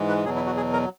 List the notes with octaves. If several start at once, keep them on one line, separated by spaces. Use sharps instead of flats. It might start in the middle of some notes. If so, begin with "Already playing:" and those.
Already playing: G#2 E3 G#3
B4
E2 B2 F#3 G#4
E4
F#4
G#4
A#4